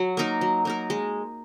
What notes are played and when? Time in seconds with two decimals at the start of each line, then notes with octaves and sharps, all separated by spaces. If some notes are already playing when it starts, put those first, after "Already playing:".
Already playing: F#3
0.17 A#3 D#4 A#4
0.41 F#3
0.65 A#3 D#4 A#4
0.90 G#3